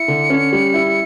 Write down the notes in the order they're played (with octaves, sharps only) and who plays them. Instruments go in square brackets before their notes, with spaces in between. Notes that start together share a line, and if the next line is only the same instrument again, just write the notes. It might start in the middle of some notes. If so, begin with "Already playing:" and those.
Already playing: [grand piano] E4 [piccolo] C#7
[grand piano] D3
C#4
G3
E4